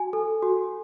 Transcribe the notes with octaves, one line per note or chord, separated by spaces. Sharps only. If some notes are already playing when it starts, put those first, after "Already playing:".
Already playing: F#4 G#5
A4
F#4